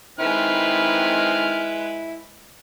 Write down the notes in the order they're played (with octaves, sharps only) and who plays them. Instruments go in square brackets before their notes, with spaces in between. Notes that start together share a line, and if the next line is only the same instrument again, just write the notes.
[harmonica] D#3 C4 F6 [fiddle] G#3 B4 [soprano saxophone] E4